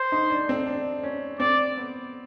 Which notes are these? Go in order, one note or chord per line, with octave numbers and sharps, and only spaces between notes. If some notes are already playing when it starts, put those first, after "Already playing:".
Already playing: C5
D#4
D4
C4
D4
C#4
C4 D5
B3